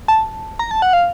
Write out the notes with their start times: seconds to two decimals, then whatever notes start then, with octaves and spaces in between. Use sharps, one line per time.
0.08 A5
0.59 A#5
0.71 A5
0.82 F#5
0.93 F5